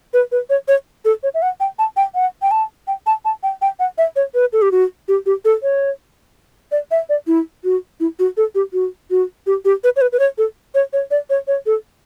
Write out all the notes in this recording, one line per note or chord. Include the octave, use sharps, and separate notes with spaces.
B4
B4
C#5
C#5
A4
C#5
E5
F#5
G5
A5
G5
F#5
G5
A5
G5
A5
A5
G5
G5
F#5
E5
C#5
B4
A4
G4
F#4
G4
G4
A4
C#5
D5
E5
D5
E4
F#4
E4
F#4
A4
G4
F#4
F#4
G4
G4
B4
C#5
B4
B4
C#5
A4
C#5
C#5
D5
C#5
C#5
A4